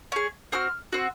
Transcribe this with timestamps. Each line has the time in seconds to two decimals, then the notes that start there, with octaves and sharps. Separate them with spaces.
0.12 C#4 G#4
0.52 C4 F#4 F6
0.93 C4 F#4